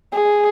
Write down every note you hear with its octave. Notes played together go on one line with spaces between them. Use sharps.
G#4